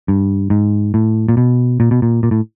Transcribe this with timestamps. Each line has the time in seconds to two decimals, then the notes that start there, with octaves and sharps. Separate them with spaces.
0.08 G2
0.50 G#2
0.94 A2
1.29 A#2
1.37 B2
1.80 A#2
1.91 B2
2.02 A#2
2.23 A#2
2.31 A2